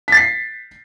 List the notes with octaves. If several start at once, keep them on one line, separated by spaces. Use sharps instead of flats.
A6 B6 C7